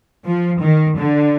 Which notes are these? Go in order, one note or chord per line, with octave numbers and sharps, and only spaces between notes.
F3
D#3
D3